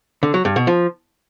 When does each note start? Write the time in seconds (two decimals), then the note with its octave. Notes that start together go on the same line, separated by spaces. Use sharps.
0.23 D3
0.34 F#3
0.45 G2
0.56 B2
0.67 F3